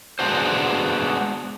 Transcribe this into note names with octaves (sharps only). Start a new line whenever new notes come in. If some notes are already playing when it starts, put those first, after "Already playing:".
G#3 B3 D4 D#4 F#4 C5